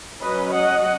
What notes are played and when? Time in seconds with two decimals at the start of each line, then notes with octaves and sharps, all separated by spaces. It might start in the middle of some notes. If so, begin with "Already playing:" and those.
0.21 F#3 C#4 B4 D#5
0.54 D#5 F#5